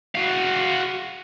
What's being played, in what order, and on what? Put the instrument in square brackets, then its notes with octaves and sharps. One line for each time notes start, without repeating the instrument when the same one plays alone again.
[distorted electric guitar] F#4 F5